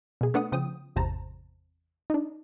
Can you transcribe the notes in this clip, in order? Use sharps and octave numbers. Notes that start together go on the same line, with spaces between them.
B2 G#4
A3 B3 D4 F#5 D#6
C#3 F3 G5 D#6
G#1 E2 C3 C5 A5 A#5
D4 D#4